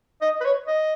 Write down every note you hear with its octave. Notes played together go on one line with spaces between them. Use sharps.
D#5
B4
C#5
D#5